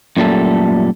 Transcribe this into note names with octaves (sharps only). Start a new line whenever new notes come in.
F#2 A#2 G3 A3 A4